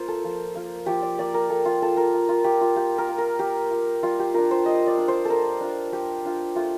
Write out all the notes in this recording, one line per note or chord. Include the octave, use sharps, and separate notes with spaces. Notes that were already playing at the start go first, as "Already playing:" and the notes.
Already playing: A#3 F4 C5
A4
F3
A#3 F4
F3 G4
D5
A#3 F4 D5
A#4
A#3 A4
F4
F4 A4
A#4
A#3
F4
F4 G4
F4
A#3 G4
A#4
F4
A#4
A#3 G4
F4
G3 F4
G4
D4 F4 A#4
C5
G3 D#5
D5
D4 F4
C5
G3 A4 A#4
D4 F4
G3 G4
D4 F4
A3 F4